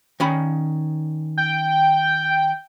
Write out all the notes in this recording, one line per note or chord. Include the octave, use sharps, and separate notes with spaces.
D#3 C#4 B5
G5